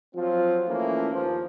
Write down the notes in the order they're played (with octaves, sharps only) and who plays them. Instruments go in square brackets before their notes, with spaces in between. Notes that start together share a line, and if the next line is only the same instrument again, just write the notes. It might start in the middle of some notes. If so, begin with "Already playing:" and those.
[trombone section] F3 F#3 C4 F4
E3 F3 A3 A#3 C#4
D#2 F3